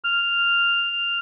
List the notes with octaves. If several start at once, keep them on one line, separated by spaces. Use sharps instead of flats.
F6